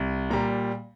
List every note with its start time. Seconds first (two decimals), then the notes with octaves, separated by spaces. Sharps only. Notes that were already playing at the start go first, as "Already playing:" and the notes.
Already playing: C2
0.30 A#2 G3 A#5